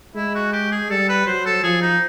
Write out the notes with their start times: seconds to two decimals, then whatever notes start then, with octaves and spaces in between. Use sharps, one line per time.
0.15 G#3 E4
0.35 F#4
0.53 G4
0.72 G#4
0.90 G3 A4
1.09 B4
1.26 F#3 C5
1.46 A4
1.63 F3 G#4
1.81 D#4